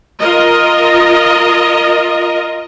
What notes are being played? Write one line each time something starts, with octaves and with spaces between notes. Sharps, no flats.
F4 A#4 D#5